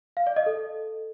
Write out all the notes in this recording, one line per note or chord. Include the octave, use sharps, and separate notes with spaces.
F5
D5
D#5
A4